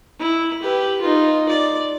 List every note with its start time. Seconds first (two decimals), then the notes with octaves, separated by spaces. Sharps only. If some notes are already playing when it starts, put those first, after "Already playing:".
0.20 E4
0.62 G4 B4
1.01 D#4 F4
1.49 D5